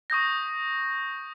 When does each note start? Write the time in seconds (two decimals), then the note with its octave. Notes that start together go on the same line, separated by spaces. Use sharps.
0.10 C#6 D#6 G6 A#6